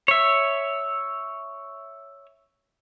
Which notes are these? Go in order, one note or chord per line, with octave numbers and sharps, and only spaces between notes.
C#5 E5